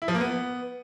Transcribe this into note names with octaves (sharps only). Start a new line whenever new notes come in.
E4
F3
A#3
B3